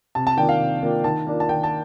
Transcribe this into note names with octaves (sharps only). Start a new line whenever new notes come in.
C3 A5
A5
D#3 A#3 D4 F4 G5
F5
C3
D#3 A#3 D4 F4
D#3 A5
A#3 D4 F4
A5
D#3 G5
A5